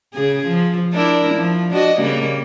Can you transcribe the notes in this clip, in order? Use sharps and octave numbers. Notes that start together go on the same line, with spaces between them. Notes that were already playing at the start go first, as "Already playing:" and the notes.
C#3 G#4
F3
D4 E4 A#4
F3
D4 F#4 D#5
C#3 G3 A#3